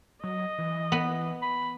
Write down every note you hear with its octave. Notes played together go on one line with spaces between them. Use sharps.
F#3 D#5
E3
B3
B5